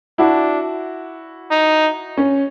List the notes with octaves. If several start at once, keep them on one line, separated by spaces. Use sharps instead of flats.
D4 E4 F#4
D#4
C#4